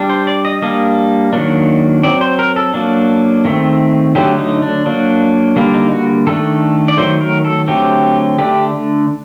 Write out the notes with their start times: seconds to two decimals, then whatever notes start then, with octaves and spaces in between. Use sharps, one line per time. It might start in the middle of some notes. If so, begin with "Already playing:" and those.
Already playing: G3 D4
0.10 C5
0.27 D5
0.45 D#5
0.62 G3 A#3 D4 D#5
1.33 D#3 F#3 A#3 D4
2.03 F#3 C4 D5
2.21 C5
2.39 A#4
2.56 A4
2.74 F#3 A#3 D4
3.45 D#3 A3 C4
4.15 D3 F#3 A3 G4
4.39 D#4
4.62 D4
4.86 F#3 A#3 D4
5.56 D3 G3 A#3
5.74 D#4
5.91 F#4
6.27 D#3 A3 D4 A4
6.88 D5
6.97 D#3 F#3 A3 C5
7.21 A#4
7.45 A4
7.68 D3 F#3 A3 C4 G4
8.38 D3 A3 D4 G4